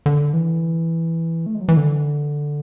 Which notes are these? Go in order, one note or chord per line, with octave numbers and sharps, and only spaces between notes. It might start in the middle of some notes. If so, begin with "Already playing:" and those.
D3
E3
A3
G#3
F#3
E3
D3